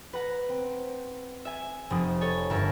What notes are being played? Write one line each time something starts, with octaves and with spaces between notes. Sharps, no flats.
B4 F#5 A#5
C4
E5 G#5
F1 D#6
A4 C#5 G#5
G1 A#4 E5 A5